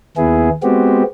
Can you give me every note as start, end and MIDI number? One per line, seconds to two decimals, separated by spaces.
0.17 0.50 39
0.17 0.50 59
0.17 0.50 64
0.17 0.50 68
0.63 1.03 56
0.63 1.03 59
0.63 1.03 60
0.63 1.03 66
0.63 1.03 67